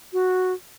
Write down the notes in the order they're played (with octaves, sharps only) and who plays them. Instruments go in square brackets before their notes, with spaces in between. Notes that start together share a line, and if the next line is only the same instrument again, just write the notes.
[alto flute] F#4